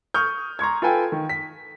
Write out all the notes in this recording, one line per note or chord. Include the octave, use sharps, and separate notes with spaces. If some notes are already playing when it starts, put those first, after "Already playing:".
C#6 D#6 F6 G6
A#5 C6 C#6 G#6
F4 A4 B4 G5 G#5
D#3
B6